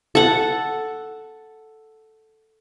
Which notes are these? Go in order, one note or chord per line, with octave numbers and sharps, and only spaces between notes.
A4 F#5